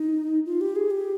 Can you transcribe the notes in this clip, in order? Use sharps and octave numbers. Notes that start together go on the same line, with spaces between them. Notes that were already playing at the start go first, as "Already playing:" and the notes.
Already playing: D#4
F4
G4
G#4
G4